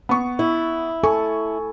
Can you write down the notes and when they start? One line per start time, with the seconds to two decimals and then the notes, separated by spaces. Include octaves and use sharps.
0.09 B3 C#6
0.39 E4
1.04 A4 G#5 C#6